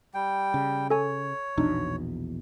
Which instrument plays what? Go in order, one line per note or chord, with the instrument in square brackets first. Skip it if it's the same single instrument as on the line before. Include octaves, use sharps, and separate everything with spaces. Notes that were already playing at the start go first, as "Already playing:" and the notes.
[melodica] G3 G5
[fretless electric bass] C#3
[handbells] A4 G#5 [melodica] C#5
[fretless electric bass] A#1 E2 B2 [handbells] D4 D#4